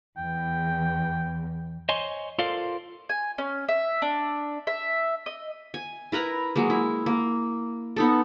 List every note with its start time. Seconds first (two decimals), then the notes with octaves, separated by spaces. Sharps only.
0.17 E2 G5
1.89 C5 C#5 D#5 G#5 C6
2.39 F4 A4 A#4 C5 D5 F5
3.09 G#5
3.38 C#4
3.68 E5
4.02 D4
4.67 E5
5.26 D#5
5.74 G#5
6.12 E4 A#4 B4 A#5
6.56 F#3 G#3 A#3
6.70 E4
7.06 A#3
7.96 B3 D#4 A4